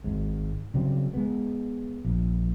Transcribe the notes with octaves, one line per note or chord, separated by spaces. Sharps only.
G#1 G#2
C#3 F#3 G3 C4
G#3 B3
A#1